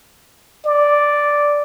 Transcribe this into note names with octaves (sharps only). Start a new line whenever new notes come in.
D5